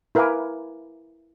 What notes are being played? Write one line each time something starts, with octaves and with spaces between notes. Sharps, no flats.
E4 A#4 B4 F5 G#5 D6